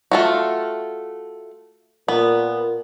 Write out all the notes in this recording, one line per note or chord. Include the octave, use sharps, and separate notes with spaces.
A3 F4 F#4
A#2 B3